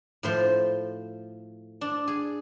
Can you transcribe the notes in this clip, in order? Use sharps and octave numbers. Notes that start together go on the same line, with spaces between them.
A2 F3 C5
D4
G#4